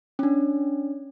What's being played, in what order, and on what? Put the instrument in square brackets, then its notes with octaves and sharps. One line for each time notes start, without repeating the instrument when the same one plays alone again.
[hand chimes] C#4 D4